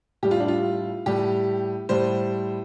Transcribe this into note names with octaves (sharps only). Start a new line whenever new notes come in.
A2 G3 G4
F4
D4
F4
A2 G3 G4
A2 G3 C5